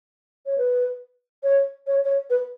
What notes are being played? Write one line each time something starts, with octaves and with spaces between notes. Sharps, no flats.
C#5
B4
C#5
C#5
C#5
B4